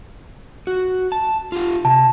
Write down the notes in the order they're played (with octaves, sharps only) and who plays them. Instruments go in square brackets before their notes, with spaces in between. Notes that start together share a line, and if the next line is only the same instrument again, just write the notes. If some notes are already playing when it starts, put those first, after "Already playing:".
[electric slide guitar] F#4
A5
F4 G4
[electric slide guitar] C3 [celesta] A5